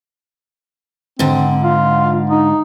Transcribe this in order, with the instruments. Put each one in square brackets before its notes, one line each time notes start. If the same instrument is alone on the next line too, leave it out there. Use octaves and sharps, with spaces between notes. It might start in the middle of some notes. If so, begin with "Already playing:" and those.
[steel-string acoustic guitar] G#2 D3 [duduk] C4
[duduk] F4
D#4